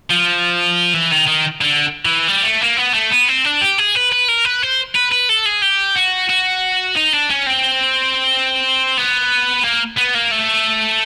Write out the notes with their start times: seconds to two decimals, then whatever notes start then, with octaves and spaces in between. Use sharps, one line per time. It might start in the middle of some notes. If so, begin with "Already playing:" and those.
0.10 F3
0.93 E3
1.11 D#3
1.27 D#3
1.61 D3
2.05 E3
2.28 G3
2.44 A3
2.62 A#3
2.77 B3
2.94 A3
3.11 B3
3.28 C4
3.45 D4
3.61 G4
3.78 G#4
3.95 B4
4.12 B4
4.28 A#4
4.45 B4
4.62 C5
4.95 B4
5.11 B4
5.29 A4
5.46 G#4
5.62 G4
5.96 F#4
6.30 F#4
6.96 D#4
7.13 D4
7.29 C#4
7.46 C4
8.97 B3
9.63 A#3
9.97 B3
10.14 A#3
10.31 A3